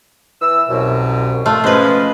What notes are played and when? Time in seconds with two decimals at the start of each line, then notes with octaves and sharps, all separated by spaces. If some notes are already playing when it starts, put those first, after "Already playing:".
0.40 E3 E6
0.69 C2 F#2 B2
1.46 A3 F4
1.64 F3 G#3 C#4 B4 C5